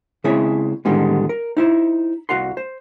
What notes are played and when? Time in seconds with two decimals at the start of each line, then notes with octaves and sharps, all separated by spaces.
0.24 C#3 G#3 C4 E4 G#4 C#5
0.85 A2 D3 D#3 G3 G#3 B3
1.29 A#4
1.57 D#4 E4 C5
2.29 C2 F#4 F5 F#5 C6
2.57 C5